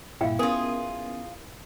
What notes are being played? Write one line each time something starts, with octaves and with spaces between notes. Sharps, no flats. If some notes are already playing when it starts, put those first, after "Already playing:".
G2 A#2 E4 F5 G5
B3 C#4 F4 G#4 A#4